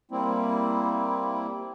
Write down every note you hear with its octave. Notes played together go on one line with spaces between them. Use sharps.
G3 A#3 C4 E4